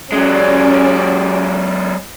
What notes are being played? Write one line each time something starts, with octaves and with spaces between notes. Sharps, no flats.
F#3 G#3 C#4 D5